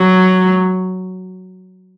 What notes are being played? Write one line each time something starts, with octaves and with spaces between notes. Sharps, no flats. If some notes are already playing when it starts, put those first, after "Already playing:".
Already playing: F#3